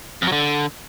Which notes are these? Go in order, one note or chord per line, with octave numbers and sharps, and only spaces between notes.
F2
F#3
D3